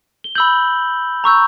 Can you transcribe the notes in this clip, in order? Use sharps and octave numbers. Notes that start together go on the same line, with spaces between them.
G7
B5 E6 G6 F#7
A#5 C#6 E6 G6